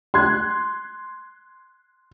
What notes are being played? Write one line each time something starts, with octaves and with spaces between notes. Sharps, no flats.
C6 F#6 G#6